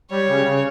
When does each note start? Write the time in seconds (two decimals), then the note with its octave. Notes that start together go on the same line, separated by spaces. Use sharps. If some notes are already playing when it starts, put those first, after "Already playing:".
0.11 G3 C#5
0.29 C#3
0.46 C#3